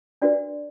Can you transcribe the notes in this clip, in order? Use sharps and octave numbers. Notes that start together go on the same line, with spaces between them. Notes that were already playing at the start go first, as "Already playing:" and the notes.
D4 F#4 B4 D5